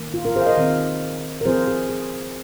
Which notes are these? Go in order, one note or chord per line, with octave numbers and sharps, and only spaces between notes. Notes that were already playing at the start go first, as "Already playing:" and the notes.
Already playing: D#3 A#3
F4
F4 A#4
G#4 C5
F5
A#4 D#5
D#3 C4 F4
A#4
F3 C4 F4 G#4 C5
G#4
G#4